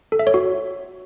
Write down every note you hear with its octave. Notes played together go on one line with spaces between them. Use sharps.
A4
E5
C#5
F#4